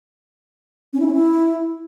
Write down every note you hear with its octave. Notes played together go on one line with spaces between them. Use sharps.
C#4
E4
C#4
E4